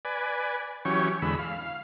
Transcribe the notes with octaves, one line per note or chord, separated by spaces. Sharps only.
B4 D5 G#5
E3 F#3 C#4 G4 C#5
E2 D3 G#3 B5 E6
F5